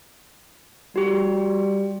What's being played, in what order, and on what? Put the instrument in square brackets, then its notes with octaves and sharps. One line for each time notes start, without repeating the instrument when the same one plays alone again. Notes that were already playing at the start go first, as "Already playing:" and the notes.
[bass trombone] G3 [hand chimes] F#4 G4